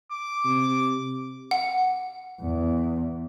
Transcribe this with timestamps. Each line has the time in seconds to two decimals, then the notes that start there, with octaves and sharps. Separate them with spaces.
0.11 D6
0.45 C3
1.51 F#5
2.41 E2